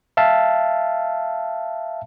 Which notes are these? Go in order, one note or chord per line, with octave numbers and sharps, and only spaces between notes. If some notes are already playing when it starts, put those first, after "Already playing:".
E5 F5 A5